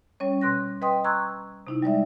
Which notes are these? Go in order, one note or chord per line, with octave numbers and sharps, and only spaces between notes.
G3 C#4 C#5
B2 C6 F#6 A#6
B4 D#5 G5 C6 D#6
A#5 C6 C#6 E6 F#6 G#6
C3 D#4 E4
G3 G#3 D5 E5